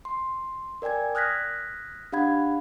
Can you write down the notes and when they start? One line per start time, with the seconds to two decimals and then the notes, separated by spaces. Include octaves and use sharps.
0.05 C6
0.82 A#4 D5 G5 G#5 G#6
1.15 D#6 F6 F#6 G#6 A#6 B6
2.12 D4 G4 F5 F#5 B5 G#6